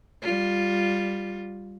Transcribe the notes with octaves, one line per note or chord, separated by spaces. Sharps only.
G3 F4